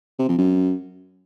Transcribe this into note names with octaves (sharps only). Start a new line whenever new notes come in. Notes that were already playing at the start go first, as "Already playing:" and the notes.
C3
F2
F#2